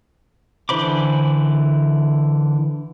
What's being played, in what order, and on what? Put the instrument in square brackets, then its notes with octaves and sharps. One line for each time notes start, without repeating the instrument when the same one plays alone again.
[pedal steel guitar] D3 E3 C5 B5 D6